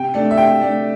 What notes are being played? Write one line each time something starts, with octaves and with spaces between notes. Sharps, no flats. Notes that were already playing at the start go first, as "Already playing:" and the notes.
Already playing: C3 G5
A3 D4
E5
C3 G5
A3 D4